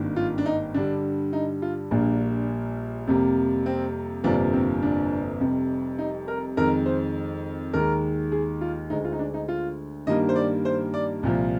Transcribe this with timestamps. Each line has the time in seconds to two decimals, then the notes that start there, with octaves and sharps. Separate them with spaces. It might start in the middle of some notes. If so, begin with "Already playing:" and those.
Already playing: G#1 G2 D#3 A#3
0.16 F4
0.38 D4
0.46 D#4
0.74 G2 D3 G3 D4
1.33 D#4
1.62 F4
1.91 A#1 A#2 G3 A#3 D4
3.07 F2 C3 G3 A#3
3.66 C4
4.24 G1 F2 C3 F3 A#3 D4
4.53 C4
4.82 D4
5.40 F1 F2 C3 G3
5.99 D#4
6.28 A#4
6.57 F2 D#3 G#3 A#4
6.86 C5
7.73 D#2 D#3 G#3 A#4
8.32 G#4
8.61 F4
8.90 D2 D3 G#3 D#4
9.04 F4
9.12 D#4
9.19 D4
9.34 D#4
9.48 F4
10.07 G2 D#3 G3 A#3 D#5
10.29 C5
10.36 D5
10.65 C5
10.94 D5
11.23 C2 A#2 F3